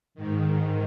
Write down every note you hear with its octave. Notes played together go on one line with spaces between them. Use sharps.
G#2 D#3